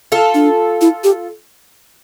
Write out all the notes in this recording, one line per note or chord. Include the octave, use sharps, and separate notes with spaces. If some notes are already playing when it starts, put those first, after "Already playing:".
F4 A4
D4
E4
G4